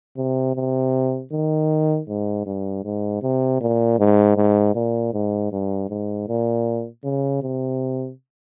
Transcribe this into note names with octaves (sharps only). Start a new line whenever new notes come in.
C3
C3
D#3
G#2
G2
G#2
C3
A#2
G#2
G#2
A#2
G#2
G2
G#2
A#2
C#3
C3